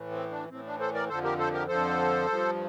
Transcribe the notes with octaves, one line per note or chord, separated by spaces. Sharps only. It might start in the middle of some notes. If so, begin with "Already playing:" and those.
Already playing: A2 E3
C4
D4
A2 E3 C4
D4
A4 C5
A#4 D5
F2 D3 F3 A4 C5
G4 A#4
A4 C5
G4 A#4
F2 D3 F3 A4 C5
G2 F3